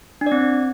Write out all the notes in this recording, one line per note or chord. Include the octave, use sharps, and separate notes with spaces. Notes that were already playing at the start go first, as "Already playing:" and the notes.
D4
D5
C4